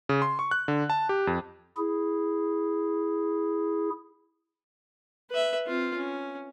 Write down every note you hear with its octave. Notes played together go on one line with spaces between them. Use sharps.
C#3
C6
C#6
F#6
D3
A5
G4
F2
E4 G#4
B4 E5
C4 F4
C#4